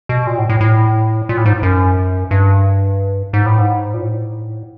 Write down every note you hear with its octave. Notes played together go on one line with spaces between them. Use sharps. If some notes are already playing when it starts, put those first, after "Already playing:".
B2
A#2
A2
A2
A2
A#2
A2
G#2
F#2
G2
G#2
A2
G#2
A#2
A2